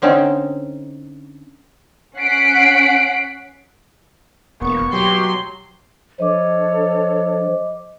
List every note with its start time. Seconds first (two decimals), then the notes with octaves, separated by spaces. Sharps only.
0.02 D3 C4 C#4 D#4
2.18 C#4 F#5 B6 C7 D7
4.62 E1 A#3 B3 C#6
4.93 B2 F#3 G4 C6
6.20 F3 D4 A4 C#5 D#5 D6